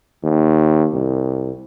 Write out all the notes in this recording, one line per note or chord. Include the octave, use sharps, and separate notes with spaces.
D#2
C2